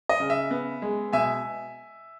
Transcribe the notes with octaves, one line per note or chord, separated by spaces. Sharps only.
D#5
C#3
E5
B3
G#3
B2 E5 G#5